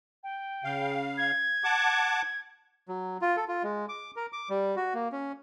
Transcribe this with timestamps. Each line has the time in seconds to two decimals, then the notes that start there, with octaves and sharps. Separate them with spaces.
0.23 G5
0.64 C#3 F5
1.18 G#6
1.64 F#5 A5 D6
2.88 F#3
3.21 F4
3.37 A4
3.48 F4
3.63 G#3
3.89 D6
4.16 A#4
4.33 D6
4.50 G3
4.76 F#4
4.94 A#3
5.12 C#4